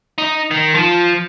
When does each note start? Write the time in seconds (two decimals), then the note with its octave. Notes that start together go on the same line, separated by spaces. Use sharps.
0.18 D#4
0.51 D#3
0.75 F3